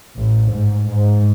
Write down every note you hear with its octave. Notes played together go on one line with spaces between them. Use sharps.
A1
G#2
G#2